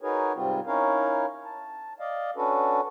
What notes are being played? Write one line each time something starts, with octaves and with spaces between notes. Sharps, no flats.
D#4 F#4 G#4 A#4 B4 C#5
G#2 C3 G3 C4 F4
C#4 D#4 E4 A#4 C#5 F5
A5
D5 D#5 F5
C#4 D4 F#4 A4 B4